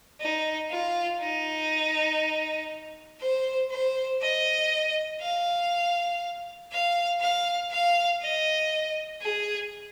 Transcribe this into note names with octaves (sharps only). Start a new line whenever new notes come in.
D#4
F4
D#4
C5
C5
D#5
F5
F5
F5
F5
D#5
G#4